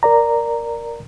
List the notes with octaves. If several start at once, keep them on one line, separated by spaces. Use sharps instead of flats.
A#4 D5 A#5